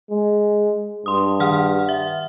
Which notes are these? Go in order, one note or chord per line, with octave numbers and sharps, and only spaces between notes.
G#3
G2 C6 D#6
D#3 F#5 F6
E5